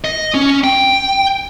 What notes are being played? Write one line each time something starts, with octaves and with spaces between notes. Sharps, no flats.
D#5
C#4
G5